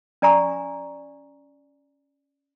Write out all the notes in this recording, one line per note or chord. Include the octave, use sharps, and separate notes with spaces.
C#4 D5 G#5 A#5 C#6